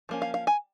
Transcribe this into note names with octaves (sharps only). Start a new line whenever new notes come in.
F3 A#3 C#4
F5
F5
G#5